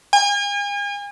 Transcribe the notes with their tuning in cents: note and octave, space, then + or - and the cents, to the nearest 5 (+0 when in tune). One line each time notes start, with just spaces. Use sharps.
G#5 -40